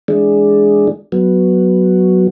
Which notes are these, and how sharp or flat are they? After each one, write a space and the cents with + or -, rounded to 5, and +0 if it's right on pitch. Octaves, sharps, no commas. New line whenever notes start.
E3 +0 G#3 +0 D4 +0
F#3 +0 B3 +0